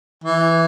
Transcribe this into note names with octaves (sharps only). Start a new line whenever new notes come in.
E3